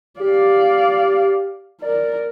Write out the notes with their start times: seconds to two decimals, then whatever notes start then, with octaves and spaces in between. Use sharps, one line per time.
0.20 G4 D5 F5
1.82 A#4 D5